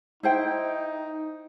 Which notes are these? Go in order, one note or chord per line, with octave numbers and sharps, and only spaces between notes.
D#4 E4 C5 G5